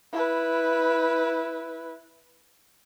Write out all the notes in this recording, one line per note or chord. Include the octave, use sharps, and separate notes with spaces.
E4 B4